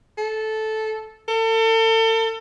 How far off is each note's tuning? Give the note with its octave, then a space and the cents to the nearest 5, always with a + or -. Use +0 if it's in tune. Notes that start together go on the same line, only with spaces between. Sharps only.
A4 -10
A4 +35